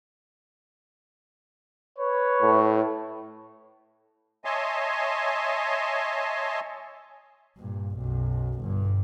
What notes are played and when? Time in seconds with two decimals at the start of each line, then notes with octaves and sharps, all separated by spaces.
1.99 B4 C#5
2.41 A2
4.45 C#5 D#5 E5 G#5 A5 C6
7.57 G2 A#2
7.96 B1 F#2
8.61 G1 G2